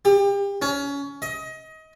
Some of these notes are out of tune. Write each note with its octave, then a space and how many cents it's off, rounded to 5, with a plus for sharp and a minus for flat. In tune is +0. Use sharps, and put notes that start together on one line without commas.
G4 +30
C#4 +25
D#5 +25